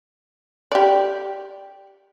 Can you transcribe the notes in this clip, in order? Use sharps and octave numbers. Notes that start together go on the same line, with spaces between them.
G4 D5